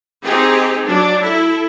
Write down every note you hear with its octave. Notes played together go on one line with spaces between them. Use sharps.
C4 D#4 G4 G#4
F#3 D4
E4 A4